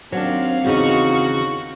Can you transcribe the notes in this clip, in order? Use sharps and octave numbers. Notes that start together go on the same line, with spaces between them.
D#2 F#3 C4 D4 F5
E2 C#3 D#4 F#4 C#6